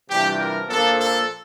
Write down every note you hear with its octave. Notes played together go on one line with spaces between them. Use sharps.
C3 E3 G3 D4 F4 G4
A#4
A#2 F3 A#3 D4 A4
A4